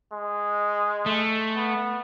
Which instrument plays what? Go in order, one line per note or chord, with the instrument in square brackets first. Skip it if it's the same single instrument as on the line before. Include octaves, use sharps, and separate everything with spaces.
[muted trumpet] G#3
[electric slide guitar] A3
[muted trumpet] B3